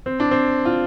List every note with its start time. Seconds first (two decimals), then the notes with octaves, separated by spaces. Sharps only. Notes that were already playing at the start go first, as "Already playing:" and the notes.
0.06 C4
0.20 D4
0.31 C4
0.65 F4